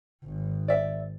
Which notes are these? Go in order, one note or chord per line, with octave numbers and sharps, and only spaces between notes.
G#1
D5 E5